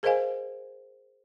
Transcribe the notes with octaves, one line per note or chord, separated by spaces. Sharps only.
G#4 A#4 C5 D#5 F5 G#5